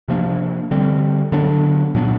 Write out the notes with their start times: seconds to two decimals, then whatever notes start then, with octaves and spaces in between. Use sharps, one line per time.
0.08 C3 F3 A#3 D4
0.71 D3 G3 C4
1.32 D3 F#3 B3 D4
1.95 A#2 F#3 B3 D4